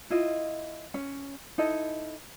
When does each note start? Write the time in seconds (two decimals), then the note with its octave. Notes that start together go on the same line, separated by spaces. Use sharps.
0.10 E4 F4 D#5
0.94 C#4
1.58 D#4 E4 A4 D#5